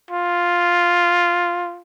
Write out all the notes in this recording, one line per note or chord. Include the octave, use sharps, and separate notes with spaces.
F4